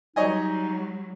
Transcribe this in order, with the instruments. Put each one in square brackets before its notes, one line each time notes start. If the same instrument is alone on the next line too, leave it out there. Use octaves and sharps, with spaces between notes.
[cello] F#3 G3 [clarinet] D#4 [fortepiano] C#5 D#5 G#5